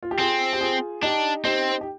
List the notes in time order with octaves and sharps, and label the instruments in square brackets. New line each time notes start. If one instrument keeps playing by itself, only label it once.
[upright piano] F4
G4
[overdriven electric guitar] C4 [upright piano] F4 G#4
[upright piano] G4
F4 G#4
[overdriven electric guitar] D4 [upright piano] D#4 G4
[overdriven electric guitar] C4 [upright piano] D#4 G4
[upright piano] G4